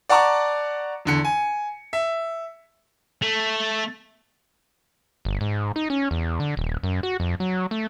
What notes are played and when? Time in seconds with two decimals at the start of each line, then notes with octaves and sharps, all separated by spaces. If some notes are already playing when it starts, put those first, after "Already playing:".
0.09 D5 F#5 A5 A#5 C#6 D6
1.05 E2 D3 C#7
1.25 G#5
1.93 E5
3.22 A3
5.25 G1
5.41 G#2
5.76 D#4
5.90 C#4
6.11 E2
6.40 D3
6.57 D#1
6.83 F#2
7.03 F#4
7.20 F2
7.40 F#3
7.71 A3